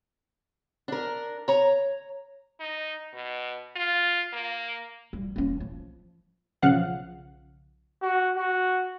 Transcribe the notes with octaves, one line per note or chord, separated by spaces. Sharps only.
D4 A#4
C#5 A#5
D#4
B2
F4
A#3
G3
A#3 C#4
F3
B1 C#3 F3 F5 F#5 F#6
F#4
F#4